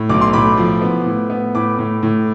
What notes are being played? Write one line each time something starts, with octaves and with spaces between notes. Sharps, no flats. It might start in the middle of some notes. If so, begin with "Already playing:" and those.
Already playing: A2
B1 D6
C6
A2 B5 D6
F3
B3
A2
B3
A2 B5 D6
A2
A2